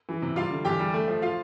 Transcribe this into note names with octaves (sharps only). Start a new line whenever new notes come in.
E3
C3
G3 F4 F5
D3
E2 G4 G5
G3
A3
F3
F4 F5